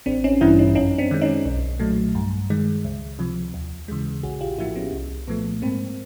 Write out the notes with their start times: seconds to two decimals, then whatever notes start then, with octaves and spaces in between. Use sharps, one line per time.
0.06 A1 C4 D4
0.24 C#4 D#4
0.41 G2 E3 G3 D4 E4
0.59 C#4 D#4
0.75 F#2 C#4 D#4
0.98 C4 D4
1.11 D#3 G#3
1.22 C#4 D#4
1.45 B1
1.79 A#2 F#3 A3
2.15 G2
2.50 D#3 G#3
2.85 C#2
3.19 C3 F3
3.54 D#2
3.88 C#3 E3 G#3
4.23 A#1 F#4 G#4
4.41 F4 G4
4.58 A2 F3 A#3 E4 F#4
4.76 B3 C#4
4.93 C2
5.28 A#2 F3 A3 B3
5.62 G#2 A#3 C4